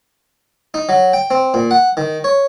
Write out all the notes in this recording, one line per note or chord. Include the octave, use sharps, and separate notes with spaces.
D#4
F#3
G5
C4
A#2
F#5
D#3
C#5